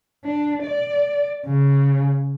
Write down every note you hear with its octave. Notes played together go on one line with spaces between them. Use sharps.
D4
D5
C#3